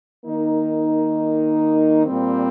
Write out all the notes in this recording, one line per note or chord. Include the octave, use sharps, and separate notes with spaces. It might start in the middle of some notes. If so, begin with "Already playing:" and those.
D#3 A#3 D#4
A#2 G3 C4